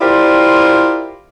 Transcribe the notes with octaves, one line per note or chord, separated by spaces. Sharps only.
E4 F4 G4 A#4 C5 D5